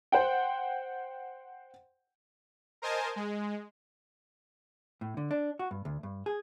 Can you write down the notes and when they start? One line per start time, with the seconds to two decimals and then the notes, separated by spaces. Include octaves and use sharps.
0.12 C5 F#5 G5
2.82 A#4 C5 D#5 G#5 A5
3.16 G#3
5.01 A2
5.17 D3
5.31 D4
5.59 F#4
5.71 G2
5.85 D2
6.03 G2
6.26 G#4